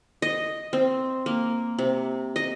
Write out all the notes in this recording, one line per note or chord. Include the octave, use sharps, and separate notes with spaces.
D#5
C4
A#3
C3
D#5